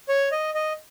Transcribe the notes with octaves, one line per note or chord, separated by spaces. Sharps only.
C#5
D#5
D#5